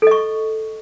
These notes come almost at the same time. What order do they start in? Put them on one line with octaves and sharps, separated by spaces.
A4 D#5 C#6